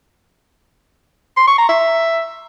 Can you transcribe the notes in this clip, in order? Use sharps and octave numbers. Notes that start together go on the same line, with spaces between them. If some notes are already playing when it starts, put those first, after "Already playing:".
C6
C#6
A#5
E5